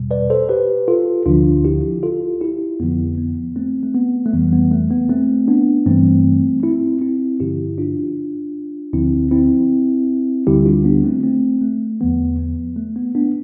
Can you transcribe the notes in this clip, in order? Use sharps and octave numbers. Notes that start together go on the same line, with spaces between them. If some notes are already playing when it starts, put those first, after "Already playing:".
Already playing: E2 B2 G3
B4 D5
A4 C5
G4 B4
F4 A4
D2 D3 F3 D4 F4
E4 G4
F4 A4
E4 G4
F2 D3 F3 B3
B3
A3 C4
A3
B3
A3
F2 E3 G3 B3
B3
A3
B3
A3 C4
B3 D4
G2 E3 G3 A3 C4
C4 E4
C4 E4
G2 D3 F3 E4 G4
D4 F4
D2 D3 F3 C4 E4
C4 E4
D2 D3 G3 E4 G4
D4 F4
B3 D4
A3 C4
A3 C4
A3
E2 D3 F3 B3
B3
A3
B3
B3 D4